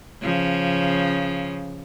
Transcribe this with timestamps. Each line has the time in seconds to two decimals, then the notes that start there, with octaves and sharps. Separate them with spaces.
0.21 C#3 F3